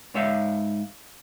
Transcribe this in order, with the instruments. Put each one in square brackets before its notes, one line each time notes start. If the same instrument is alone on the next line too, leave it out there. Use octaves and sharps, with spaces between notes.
[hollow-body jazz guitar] G#2 C#5 E5 F5